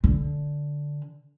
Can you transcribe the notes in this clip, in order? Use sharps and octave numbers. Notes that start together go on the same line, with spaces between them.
D3